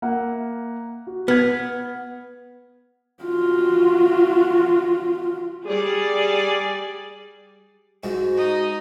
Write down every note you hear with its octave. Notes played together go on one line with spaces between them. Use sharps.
A#3 E5 F#5
F#4
B3 F6 G#6
F4 F#4
G3 G#4 D5
G#2 F#4
D#4 D#5